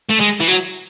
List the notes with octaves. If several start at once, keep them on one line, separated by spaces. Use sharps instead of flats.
A3
G#3
E3
F#3